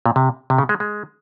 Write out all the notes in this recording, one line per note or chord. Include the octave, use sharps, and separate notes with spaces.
A#2
C3
C3
C#3
G#3
G#3